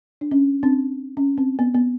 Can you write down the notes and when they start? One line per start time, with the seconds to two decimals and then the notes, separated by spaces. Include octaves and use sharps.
0.21 D4
0.31 C#4
0.63 C4 D4
1.17 C#4
1.38 C4
1.59 B3
1.74 B3